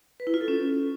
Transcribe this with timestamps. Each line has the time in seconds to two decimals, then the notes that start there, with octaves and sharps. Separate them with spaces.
0.20 B4
0.27 E4
0.34 F4
0.41 A4
0.48 C#4